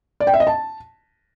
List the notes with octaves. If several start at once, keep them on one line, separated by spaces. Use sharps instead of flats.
D5
G5
E5
D#5
A5